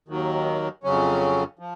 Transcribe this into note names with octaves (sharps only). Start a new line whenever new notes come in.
D#2 D#3 F#3
F2 C#3 F#3 C#4
F3